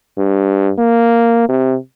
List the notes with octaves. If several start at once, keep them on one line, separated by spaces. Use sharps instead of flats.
G2
A#3
C3